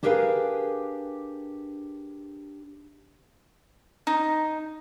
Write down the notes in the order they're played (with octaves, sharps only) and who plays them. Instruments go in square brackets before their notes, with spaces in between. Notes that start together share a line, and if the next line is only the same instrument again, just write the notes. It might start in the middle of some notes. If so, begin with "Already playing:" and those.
[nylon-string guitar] D4 G4 G#4 A#4 B4 F5
[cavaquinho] D#4